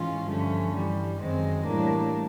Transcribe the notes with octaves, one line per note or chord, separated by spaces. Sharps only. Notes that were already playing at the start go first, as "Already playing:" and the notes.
Already playing: G#2 E3 G#3 C#4 F4
G2 D3 F3 A3 C#4
G2 E3 G3
F#2 D#3 G#3 C4
A2 E3 G3 A#3 D4